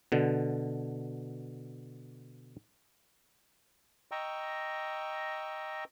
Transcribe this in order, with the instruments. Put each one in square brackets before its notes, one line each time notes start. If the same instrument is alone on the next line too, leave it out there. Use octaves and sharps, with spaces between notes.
[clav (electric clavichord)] B2 D3
[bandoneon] D#5 G5 A#5 C#6 E6